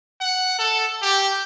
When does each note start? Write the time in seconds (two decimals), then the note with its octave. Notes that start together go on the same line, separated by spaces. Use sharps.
0.21 F#5
0.59 A4
1.02 G4